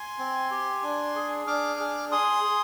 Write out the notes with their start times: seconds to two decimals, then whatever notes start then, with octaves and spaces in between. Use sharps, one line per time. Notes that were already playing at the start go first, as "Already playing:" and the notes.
Already playing: G#5 C6
0.19 C4
0.51 G4
0.83 D4
1.15 G#4
1.47 D4 D6 F6
1.80 G#4
2.12 G#4 C6 D#6
2.44 G#4